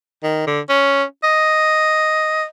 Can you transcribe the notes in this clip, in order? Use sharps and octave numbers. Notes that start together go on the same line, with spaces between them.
D#3
D3
C#4
D#5